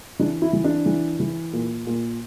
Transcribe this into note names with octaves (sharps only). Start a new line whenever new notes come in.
E3 D4
E4
E3
D4
E3
E3
A#2
A#2